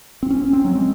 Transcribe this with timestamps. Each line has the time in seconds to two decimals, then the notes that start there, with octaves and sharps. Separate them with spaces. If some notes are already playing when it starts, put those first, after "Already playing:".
0.23 C4
0.30 C#4
0.53 C4
0.64 F#3
0.75 G#3